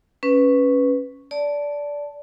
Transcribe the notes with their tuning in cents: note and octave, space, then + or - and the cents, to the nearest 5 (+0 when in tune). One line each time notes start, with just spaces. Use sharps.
C#4 +0 B4 +0
D5 -15 A5 +0